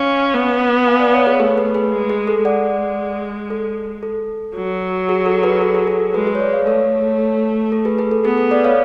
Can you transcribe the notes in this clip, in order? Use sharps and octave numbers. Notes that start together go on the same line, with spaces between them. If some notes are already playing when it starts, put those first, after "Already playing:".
Already playing: C#4 F5 G#5
B3
F5 G#5
D5 F#5
C#5 F5
G#4 B4
A3 G#4 B4
G#4 B4
G#4 B4
G#3
G#4
A4
G#3 D5 F#5
A4
A4
F#3
G#4
A4
G#4 B4
A4
G#4
A4
G#3 G#4 B4
G#4 B4
C#5
B4 D5
C#5 F5
A3 A4 C#5
A4
G#4 B4
G#4 B4
A4
B3 G#4
A4
B4 D5
C#5 F5